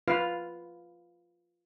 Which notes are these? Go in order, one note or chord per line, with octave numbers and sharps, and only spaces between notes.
F4 B4 F5